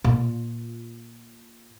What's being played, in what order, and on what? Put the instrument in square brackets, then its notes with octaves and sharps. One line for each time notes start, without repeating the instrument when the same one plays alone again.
[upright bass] A#2 F4